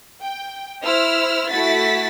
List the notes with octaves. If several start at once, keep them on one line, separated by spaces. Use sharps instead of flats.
G5
E4 C5 E6 F6
A3 E4 F#4 A6 B6